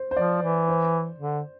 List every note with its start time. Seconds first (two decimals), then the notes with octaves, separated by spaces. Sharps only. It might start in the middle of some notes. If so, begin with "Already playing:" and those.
Already playing: C5
0.11 C5
0.16 F3 D5
0.43 E3
0.68 C5
1.19 D3